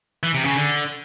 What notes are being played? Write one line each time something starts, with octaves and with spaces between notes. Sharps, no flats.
E3
C3
C#3
D3